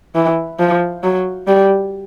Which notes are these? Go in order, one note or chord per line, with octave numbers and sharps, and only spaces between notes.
E3
F3
F#3
G3